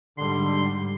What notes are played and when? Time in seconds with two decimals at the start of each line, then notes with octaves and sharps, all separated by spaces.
0.18 G#2 D3 G3 C6